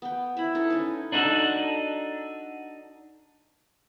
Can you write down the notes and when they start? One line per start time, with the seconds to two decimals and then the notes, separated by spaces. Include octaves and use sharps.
0.02 B3 G5
0.37 E4 E5 B5
0.55 D#4 A4
0.70 C#4 B4
1.12 D4 D#4 F#4 A4